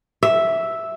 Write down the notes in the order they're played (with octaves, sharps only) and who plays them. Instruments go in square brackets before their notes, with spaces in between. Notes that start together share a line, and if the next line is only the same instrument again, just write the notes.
[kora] E5